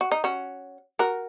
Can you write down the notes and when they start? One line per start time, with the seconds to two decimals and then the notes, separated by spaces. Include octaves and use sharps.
0.01 F#4
0.12 D#4
0.24 C#4 F#4
0.99 F#4 A#4